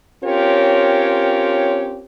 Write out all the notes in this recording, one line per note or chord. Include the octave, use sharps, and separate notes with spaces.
C4 C#4 F4 G4 A#4 C#5